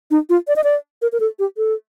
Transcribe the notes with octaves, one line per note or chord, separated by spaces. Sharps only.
D#4
F4
D5
D#5
D5
A#4
A#4
A4
G4
A4